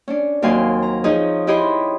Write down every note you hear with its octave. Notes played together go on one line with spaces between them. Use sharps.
C#4 D4
D#2 F#3 C4 F5 G#5 C6
A#5
F3 D#4 G#4 C#5 D#5
E4 G4 C#5 D#5 B5 C6